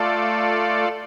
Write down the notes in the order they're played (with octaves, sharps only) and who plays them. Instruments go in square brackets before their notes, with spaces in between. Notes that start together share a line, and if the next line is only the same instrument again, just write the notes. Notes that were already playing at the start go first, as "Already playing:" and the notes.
Already playing: [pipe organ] A3 F4 A4 D5